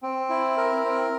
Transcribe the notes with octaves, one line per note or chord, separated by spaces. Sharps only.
C4
E4
A#4
C4